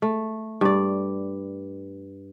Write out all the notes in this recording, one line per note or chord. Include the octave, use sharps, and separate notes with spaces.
A3
G2 D5